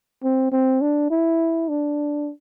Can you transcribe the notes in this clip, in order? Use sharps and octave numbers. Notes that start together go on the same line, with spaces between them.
C4
C4
D4
E4
D4